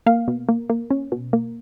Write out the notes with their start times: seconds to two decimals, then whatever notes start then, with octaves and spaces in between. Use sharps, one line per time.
0.06 A#3 F5
0.28 B2
0.49 A#3
0.70 A#3
0.91 C#4
1.12 B2
1.33 A#3